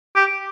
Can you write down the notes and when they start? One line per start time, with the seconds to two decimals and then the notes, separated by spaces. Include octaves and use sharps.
0.16 G4